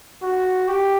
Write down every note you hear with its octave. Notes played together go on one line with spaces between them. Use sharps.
F#4
G4